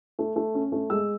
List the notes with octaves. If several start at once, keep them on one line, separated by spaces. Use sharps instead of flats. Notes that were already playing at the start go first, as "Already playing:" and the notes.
A3
A3
C#4
A3
G#3 E6